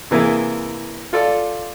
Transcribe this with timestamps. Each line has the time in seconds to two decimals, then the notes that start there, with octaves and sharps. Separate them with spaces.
0.11 C3 E3 A#3 E4 G#4
1.13 F4 A4 D5